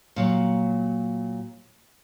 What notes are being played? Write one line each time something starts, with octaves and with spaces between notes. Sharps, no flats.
A#2 F#3